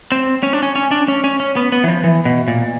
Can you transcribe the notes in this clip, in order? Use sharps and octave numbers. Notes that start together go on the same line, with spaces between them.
C4
C#4
D4
C#4
C#4
D4
C#4
C#4
C#4
B3
B3
E3
F3
E3
B2
A#2